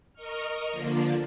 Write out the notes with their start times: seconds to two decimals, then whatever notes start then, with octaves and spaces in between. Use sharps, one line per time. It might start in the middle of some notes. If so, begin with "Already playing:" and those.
0.14 A#4 D#5 C#6 F6
0.71 D3 F3 A#3 D4 F4